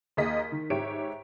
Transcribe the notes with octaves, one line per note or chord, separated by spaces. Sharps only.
D#2 A#3 G#4 D#5 B6
D#3
G#2 G4 C#5 E5 D7